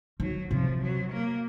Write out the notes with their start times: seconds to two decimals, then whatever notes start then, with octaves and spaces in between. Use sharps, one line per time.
0.20 D#3 F#3
0.51 C3 F3
0.82 F#3
1.13 A#3